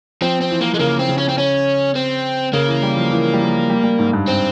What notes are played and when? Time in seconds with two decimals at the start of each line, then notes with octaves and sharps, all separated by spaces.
0.21 F3 C4
0.41 C4
0.51 E3
0.61 A#3
0.74 G#3
0.79 C#3 A#3
0.99 C4
1.09 C#3
1.18 C#4
1.29 C4
1.38 C#4
1.95 C4
2.53 C#3 A#3
2.68 E3
2.83 G3
2.97 F3
3.11 E3
3.33 G3
3.41 F3
3.70 G3
3.83 G3
3.99 G#2
4.13 G2
4.28 C4